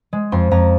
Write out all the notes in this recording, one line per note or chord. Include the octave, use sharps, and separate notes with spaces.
G#3
F2 C6
F2 A#5